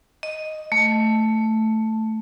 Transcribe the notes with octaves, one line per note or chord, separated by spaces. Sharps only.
D#5
A3